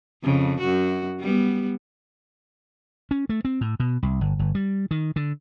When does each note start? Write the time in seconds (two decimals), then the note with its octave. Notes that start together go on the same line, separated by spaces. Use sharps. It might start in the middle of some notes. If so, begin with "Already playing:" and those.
0.24 F2 C#3
0.60 F#2 F#4
1.20 G3 B3
3.11 C#4
3.29 A3
3.45 C4
3.61 A2
3.80 B2
4.03 C2
4.21 G1
4.39 G1
4.55 G3
4.91 D#3
5.16 D3